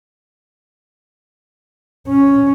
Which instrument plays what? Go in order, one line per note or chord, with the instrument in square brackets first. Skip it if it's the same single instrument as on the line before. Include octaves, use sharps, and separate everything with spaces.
[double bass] C#4